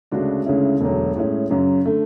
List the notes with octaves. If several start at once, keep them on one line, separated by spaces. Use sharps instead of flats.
D2 C#3 G#3 D4 F#4
D2 C#3 G#3 C#4 E4
E1 D2 D3 F#3
A2 G#3 C#4 E4
F#2 C#3 F#3
D3 A3